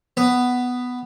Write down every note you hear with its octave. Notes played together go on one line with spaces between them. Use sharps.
B3